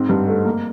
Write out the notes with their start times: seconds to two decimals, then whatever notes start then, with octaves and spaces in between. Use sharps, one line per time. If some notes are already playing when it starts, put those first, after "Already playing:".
Already playing: G#2 C4
0.09 G2
0.28 A3
0.45 A#3